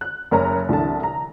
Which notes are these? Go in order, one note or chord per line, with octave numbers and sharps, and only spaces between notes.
F#6
F#1 A#4 C#5 A#5
C2 D3 E3 A5
A#5